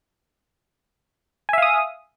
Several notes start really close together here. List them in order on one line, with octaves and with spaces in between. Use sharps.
G#5 E5 F5 D#6